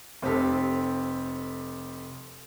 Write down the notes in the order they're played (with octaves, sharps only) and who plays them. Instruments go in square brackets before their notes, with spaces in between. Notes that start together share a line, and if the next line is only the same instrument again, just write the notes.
[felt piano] F1 C4 G4 A4